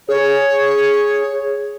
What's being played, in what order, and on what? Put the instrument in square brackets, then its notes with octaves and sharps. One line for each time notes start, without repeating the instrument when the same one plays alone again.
[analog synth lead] G#4 [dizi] C#5